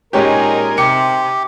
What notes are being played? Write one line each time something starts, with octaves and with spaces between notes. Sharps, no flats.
A#2 G#3 C#4 D#4 G4 G#4 A#4
C3 G4 C#7